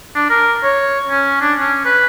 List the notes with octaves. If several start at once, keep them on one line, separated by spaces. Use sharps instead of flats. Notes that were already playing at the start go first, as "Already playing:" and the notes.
D4
A#4
C#5
C#4
D4
C#4
B4